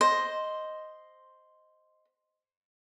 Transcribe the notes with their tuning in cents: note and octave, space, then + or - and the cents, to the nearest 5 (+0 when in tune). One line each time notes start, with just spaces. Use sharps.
C5 +0 D#5 +0